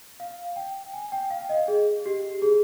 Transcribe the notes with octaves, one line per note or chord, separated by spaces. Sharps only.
F5
G5
G#5
G5
F5
D#5
G#4
G4
G#4